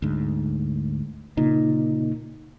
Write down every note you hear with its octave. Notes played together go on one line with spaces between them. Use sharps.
D2 G#2
A#2 C#3 D#4